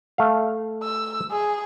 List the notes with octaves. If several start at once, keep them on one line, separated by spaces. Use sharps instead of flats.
A3 F5
E6
G#4